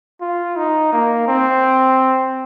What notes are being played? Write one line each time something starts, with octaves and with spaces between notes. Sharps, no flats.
F4
D#4
A#3
C4